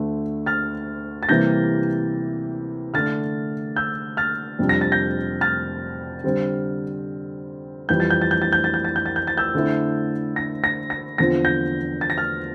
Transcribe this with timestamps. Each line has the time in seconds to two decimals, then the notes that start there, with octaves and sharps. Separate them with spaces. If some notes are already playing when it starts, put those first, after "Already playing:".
Already playing: D2 D3 A3
0.46 F6 A6
1.23 A6
1.29 C3 E3 G3 A#3 E4 G6 A#6
2.94 D3 A3 D4 F6 A6
3.76 E6 G6
4.17 F6 A6
4.59 F2 C3 G3 D4
4.69 A#6
4.81 A6
4.92 G6 A#6
5.41 F6 A6
6.24 D3 G3 C4
7.89 F2 E3 G3 G6
8.00 A6
8.10 G6
8.21 A6
8.31 G6
8.42 A6
8.52 G6
8.64 A6
8.74 G6
8.85 A6
8.96 G6
9.06 A6
9.16 G6
9.27 A6
9.37 E6 G6
9.55 D3 A3 C4 E4
10.36 A#6
10.64 A#6
10.90 A#6
11.18 E2 D3 F3 C4 F4 A#6
11.45 G6 A#6
12.01 A6
12.10 A#6
12.18 F6 A6